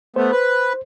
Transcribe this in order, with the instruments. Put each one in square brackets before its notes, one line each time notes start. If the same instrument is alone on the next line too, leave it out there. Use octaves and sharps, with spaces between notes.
[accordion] A3 B3 [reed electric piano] C5
[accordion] B4